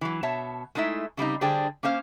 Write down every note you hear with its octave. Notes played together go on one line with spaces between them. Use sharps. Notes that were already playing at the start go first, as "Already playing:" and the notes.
E3 F#3
B2 C#5 E5 A5
G#3 A3 D#4 E4 E5
C#3 G3 C4 D#4
D3 G3 D4 G#4 C5 G5
A#3 C#4 C5 F5